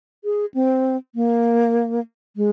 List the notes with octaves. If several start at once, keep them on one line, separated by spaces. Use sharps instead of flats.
G#4
C4
A#3
G#3